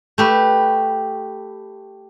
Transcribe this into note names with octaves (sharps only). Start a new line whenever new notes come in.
A3 G4 B4